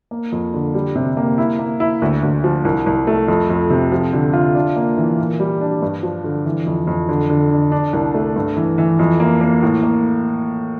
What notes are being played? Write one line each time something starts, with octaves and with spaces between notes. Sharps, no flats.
A#3
F2
D3
G3
C3
A#3
E4
A#3
E4
D2
D2
F3
C2
C2
A3
F2
F2
C3
F3
D3
F4
D4
A#3
E3
A#2
G3
D4
G2
F3
D3
E3
F2
F2
D3
D3
D4
D4
C2
A3
G2
E3
E3
F2
A#3
A#3
A2
A#3